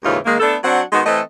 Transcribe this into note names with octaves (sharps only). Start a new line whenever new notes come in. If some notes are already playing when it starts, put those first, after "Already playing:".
D#2 G#2 C#3 E3 D#4 F4
D#3 G#3 A#3
A3 B3 D4 A4
F#3 C4 D4 F#5
D#3 G#3 B3 F#4
E3 A3 C4 A4 D#5